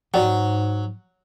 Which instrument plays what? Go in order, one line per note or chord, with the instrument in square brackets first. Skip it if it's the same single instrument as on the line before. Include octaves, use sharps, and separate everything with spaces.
[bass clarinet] G#2 [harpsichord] F#3 [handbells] F#4 D5 G5